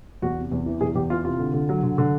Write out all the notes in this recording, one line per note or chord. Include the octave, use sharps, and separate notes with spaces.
E2 F#4
C3
E2
E3
E2 G#4
E2 G4
E3 F4
C3 F4
D3
D3
F#3
D3
D3